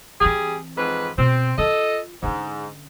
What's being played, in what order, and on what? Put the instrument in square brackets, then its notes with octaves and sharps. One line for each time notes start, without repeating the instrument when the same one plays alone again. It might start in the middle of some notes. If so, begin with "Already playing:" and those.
[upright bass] E3 C4 [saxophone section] G3 G4 G#4
[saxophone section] F2 G#2 B4
[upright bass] B2 [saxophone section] C4
[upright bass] F4 [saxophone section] A4 D#5
[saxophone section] G#2 [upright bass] D3 C#4